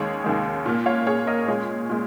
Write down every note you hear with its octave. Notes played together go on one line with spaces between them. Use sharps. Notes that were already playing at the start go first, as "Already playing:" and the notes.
Already playing: D#2 D#3 G#3 G#4 C#5
D#2 D#3 G#3
A#2 A#3
C#5 F5
A#2 A#3 G#4 C#5
A#4 D#5
A#2 G#3 G#4 C#5
A#2 G#3